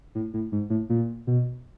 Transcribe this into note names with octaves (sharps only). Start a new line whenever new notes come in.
A2
A2
G#2
A2
A#2
B2